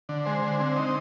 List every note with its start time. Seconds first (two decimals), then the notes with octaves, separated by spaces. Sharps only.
0.09 D3
0.25 G#3 C5
0.43 D3
0.60 C4
0.76 D#4